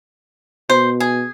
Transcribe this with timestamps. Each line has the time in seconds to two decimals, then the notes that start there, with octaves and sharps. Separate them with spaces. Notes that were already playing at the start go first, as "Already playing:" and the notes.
0.70 B2 C5
1.00 G#4